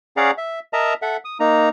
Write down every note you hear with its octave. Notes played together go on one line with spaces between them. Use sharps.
C#4 G#4 D5 F5 F#5 A#5
E5
A#4 D#5 E5 A5 A#5
A4 E5 F#5
D#6
A#3 D#4 A#5